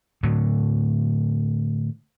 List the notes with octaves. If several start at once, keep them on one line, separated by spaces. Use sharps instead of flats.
A2 D3 F#3